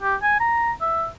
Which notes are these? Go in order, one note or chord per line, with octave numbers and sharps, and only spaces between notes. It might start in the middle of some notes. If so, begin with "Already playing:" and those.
G4
G#5
A#5
E5